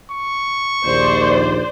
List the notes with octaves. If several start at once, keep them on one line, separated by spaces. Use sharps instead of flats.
C#6
A#1 D#2 C5 D5